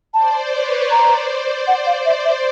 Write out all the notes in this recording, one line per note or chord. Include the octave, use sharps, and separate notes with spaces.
C5 D5 A5
B4 C#5
C5 D5 A#5
F#5
F5
C5 D5 E5
E5